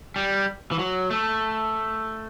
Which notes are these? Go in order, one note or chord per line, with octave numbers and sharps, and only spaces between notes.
G3
E3
F#3
A3